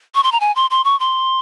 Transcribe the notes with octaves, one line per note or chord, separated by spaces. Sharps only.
C#6
C6
A#5
G#5
C6
C6
C#6
C6